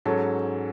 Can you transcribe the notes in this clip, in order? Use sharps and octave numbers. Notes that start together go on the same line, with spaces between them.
G#2 F#3 C#4 A4